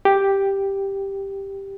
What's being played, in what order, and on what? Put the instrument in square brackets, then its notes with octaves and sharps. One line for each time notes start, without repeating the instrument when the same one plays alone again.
[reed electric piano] G4